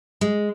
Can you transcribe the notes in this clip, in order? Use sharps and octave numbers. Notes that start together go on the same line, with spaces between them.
G#3